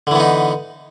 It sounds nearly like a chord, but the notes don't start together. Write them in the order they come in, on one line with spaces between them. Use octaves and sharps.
D3 E3 B3 D#4